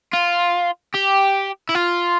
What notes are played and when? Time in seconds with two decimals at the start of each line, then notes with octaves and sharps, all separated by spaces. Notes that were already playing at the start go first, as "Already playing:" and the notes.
0.13 F4
0.94 G4
1.69 E4
1.75 F4